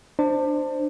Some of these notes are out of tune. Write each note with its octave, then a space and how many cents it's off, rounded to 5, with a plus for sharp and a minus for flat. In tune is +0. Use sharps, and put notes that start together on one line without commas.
D4 +25 C5 +0